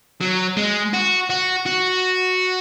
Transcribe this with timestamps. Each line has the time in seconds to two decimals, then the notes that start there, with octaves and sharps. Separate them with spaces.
0.21 F#3
0.57 G#3
0.93 F#4
1.30 F#4
1.66 F#4